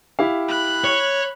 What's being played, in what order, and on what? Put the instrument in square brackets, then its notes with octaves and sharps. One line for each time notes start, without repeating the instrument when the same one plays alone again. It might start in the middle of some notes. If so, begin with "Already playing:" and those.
[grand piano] E4 G4 F5
[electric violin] B5 F#6
[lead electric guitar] C#5